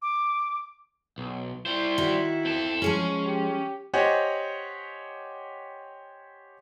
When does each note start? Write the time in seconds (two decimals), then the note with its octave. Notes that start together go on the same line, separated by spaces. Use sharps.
0.02 D6
1.18 B1
1.66 G3 E4 C5
1.98 D#3 F#4
2.45 C4 A4
2.82 F3 G#3 C#4 G#4
3.27 G4
3.94 G4 C5 C#5 D#5 F#5 G#5